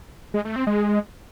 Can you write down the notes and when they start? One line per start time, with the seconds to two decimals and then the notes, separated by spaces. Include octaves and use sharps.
0.34 G#3
0.45 A3
0.56 C4
0.67 G#3